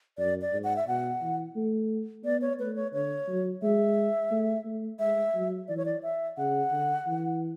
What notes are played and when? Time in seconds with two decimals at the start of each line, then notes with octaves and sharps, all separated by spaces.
0.18 F#2 D5
0.42 D5
0.53 G#2
0.64 F#5
0.76 E5
0.87 B2 F#5
1.21 E3
1.55 A3
2.24 B3 D5
2.42 C#5
2.59 A3 B4
2.76 C#5
2.93 D3 C#5
3.28 F#3
3.62 G#3 E5
4.31 A3
4.65 A3
4.99 G#3 E5
5.34 F#3
5.68 E3 D5
5.77 C#5
5.86 D5
6.03 E5
6.37 C#3 F#5
6.72 D3
7.07 E3